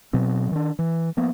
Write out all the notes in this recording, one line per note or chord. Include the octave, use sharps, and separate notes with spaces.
B2 F#3 C4
D#3 D4
E3
F3 A#3 B3